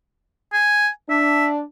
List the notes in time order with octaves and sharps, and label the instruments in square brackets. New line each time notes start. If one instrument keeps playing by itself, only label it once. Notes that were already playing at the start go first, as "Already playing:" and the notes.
[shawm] G#5
[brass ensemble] D4 [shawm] E5